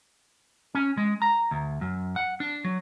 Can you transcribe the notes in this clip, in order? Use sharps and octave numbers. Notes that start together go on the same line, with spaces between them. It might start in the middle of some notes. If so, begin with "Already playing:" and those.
C#4
G#3
A#5
D2
F#2
F#5
D4
F#3